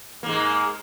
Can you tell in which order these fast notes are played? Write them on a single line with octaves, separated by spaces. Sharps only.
A#3 G#2 G#3